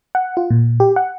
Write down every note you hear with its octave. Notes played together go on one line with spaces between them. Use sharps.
F#5
F4
A#2
G4
F#5